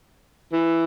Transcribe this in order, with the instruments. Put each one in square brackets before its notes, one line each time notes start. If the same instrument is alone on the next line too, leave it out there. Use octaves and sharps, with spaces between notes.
[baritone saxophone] E3